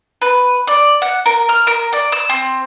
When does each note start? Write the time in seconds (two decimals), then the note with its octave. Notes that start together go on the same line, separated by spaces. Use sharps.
0.22 B4
0.67 D5
1.02 F#5
1.26 A#4
1.49 F6
1.67 A#4
1.93 D5
2.12 E6
2.29 C4